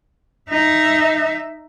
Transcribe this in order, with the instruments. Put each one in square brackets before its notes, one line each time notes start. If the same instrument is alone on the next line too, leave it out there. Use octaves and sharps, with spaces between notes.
[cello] D#4 E5